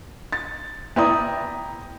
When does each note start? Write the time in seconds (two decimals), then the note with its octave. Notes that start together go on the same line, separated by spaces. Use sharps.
0.32 A6
0.96 B3 E4 D5 G5 A#5 D#6